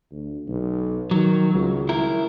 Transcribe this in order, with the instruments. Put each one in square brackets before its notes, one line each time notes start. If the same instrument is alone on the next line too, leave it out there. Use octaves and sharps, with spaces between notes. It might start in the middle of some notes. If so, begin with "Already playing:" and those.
[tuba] D2
B1
[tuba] D#3 [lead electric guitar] F#3
[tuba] C#2
[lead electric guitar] E4 A#4